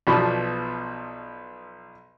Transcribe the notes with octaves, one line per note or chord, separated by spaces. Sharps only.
B1 B2 F3 B3 D4 B5